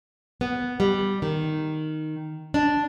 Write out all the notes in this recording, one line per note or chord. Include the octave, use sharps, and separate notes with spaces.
B3
G3
D#3
D4